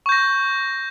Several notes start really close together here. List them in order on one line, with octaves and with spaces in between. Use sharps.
C#6 G6 A#6